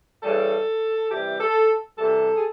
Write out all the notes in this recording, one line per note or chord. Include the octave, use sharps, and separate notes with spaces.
C#3 E3 G3 A4
C3 E3 G3 G4
A4
C3 E3 G3 A4
G#4